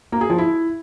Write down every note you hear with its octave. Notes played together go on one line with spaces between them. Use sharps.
A#3
G#4
F3
E4